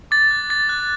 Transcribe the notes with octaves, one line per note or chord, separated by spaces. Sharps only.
D6 A6
F#6
D6 A6
F#6